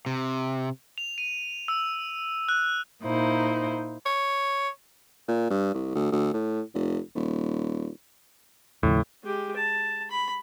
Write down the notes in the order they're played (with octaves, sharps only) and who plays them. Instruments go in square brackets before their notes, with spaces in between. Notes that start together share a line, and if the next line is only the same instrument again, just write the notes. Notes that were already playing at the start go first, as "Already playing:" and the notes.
[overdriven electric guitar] C3
[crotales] F7
D#7
E6
F#6
[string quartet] A#2 D#4 E4 C5
[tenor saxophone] C#5
[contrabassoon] A#2
G2
C2
D2
D2
A2
F1
D#1
[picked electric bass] D#2 C#3 F3 [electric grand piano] A2
[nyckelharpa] G#3 G4
A5
B5